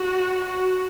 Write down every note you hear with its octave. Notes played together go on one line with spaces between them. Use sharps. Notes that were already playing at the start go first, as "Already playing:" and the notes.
Already playing: F#4
F#4